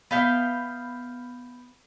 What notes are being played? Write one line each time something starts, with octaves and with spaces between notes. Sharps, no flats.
B3 E5 F5 G5